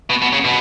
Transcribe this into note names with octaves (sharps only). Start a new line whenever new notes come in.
B2
B2
C#3
B2